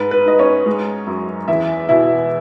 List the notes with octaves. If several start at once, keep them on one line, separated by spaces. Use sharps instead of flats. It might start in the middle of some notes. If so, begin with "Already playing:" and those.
Already playing: G#2 B4
B4
G#2 D#5
C#4 C#5
G#3
F#2
E2 E4 E5
B2 E4 E5